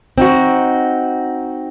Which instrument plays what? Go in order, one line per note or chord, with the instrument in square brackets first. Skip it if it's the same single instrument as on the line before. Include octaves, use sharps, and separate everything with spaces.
[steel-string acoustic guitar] C4 D#4 F#4